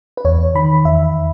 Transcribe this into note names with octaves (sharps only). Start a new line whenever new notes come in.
B4
E2 C#5
D#3 B5
E2 E5